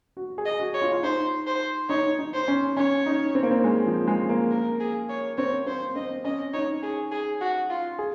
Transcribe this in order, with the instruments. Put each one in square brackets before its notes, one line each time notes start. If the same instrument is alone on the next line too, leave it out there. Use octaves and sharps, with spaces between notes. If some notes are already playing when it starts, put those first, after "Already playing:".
[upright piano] F#4
G#4
[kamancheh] D#5
[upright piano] F#4
[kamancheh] C#5
[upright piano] F4
F4
[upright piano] D#4 [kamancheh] C5
[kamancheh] C5
[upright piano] D#4 [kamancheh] C#5
[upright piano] D#4
[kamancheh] C5
[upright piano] C#4
[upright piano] C#4 [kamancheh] C#5
[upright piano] D#4
C4
A#3
C4
G#3
F3
G#3
A#3
[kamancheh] A#4
G#4
C#5
[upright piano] C4 [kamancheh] C#5
[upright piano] C4 [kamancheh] C5
[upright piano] C4 [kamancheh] D#5
[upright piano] C#4 [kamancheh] D#5
[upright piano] D#4 [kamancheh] C#5
[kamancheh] G#4
G#4
F#4
F4
[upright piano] G#4